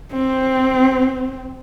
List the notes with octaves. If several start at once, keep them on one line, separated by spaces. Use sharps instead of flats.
C4